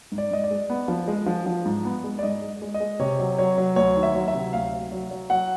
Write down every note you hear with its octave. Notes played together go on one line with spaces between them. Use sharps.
G#2
D5
G#2 D#5
D5
G#3
B3
F3
G#3
F3
F3
G#2
B3
G#3
D5
G#2 D#5
G#3
G#3
D#5
G#3
C3 C#5
F#3
F#3 C#5
F#3
D2 C#5
D#3
E5
F#3
E5
C3
D2 F5
F#3
F#3
F#3
F#3 F#5